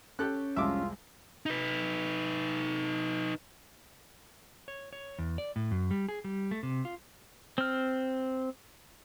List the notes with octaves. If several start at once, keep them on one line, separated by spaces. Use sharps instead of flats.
C#4 G4 A4 F#6
C2 F2 G#3 F4 E5 D6
D#4 B4
C#5
C#5
E2
D5
A2
F#2
G3
G#4
G3
A3
C3
F4
C4 F6